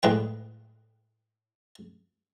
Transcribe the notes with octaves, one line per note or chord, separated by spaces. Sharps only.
A2 G#3 B4 G5